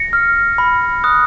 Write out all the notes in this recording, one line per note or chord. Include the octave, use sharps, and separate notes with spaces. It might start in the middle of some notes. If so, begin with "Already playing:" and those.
Already playing: A#6 C#7
F6
B5
D#6 F#6